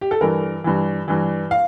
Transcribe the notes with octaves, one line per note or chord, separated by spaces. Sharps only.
G4
A4
G2 E3 A#4
G2 E3
G2 E3
F5